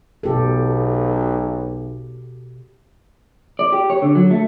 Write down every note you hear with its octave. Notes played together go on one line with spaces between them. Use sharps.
B1 B2 G4 A4
D5
G4
C#5
D3
F#3
A3